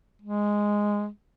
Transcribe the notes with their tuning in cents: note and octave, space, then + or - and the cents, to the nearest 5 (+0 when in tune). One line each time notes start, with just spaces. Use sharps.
G#3 -5